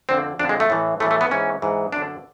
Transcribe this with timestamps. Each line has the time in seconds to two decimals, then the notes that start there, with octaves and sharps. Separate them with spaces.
0.09 F2 D3 C4
0.39 F2 D4
0.43 D3
0.49 G#3
0.60 A3
0.70 A2 E3
1.00 A2 E3 A3
1.11 A3
1.21 B3
1.31 G#2 E3 C#4
1.62 G#2 E3
1.92 F#2 D3 D4